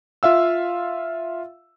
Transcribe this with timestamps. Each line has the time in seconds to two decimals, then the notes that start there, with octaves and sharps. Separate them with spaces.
0.23 F4 E5 F5 E6